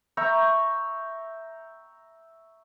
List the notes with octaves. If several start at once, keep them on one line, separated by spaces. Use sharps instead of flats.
E5 G5 A#5 C#6